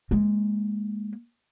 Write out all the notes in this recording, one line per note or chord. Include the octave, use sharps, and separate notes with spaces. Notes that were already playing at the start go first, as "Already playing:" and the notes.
G#3 A#3